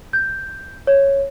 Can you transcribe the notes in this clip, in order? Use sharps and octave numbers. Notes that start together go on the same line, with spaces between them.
G6
C#5